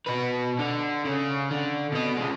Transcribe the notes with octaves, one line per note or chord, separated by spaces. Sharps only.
B2 B4
D3
C#3
D3
B2 D#5
C#3 G#3